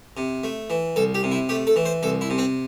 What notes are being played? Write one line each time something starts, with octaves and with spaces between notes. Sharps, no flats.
C3
A3
E3
C2 A4
G4
C3
E4
A3 G4
A4
E3
C5
C2 A4
E4
C3
C4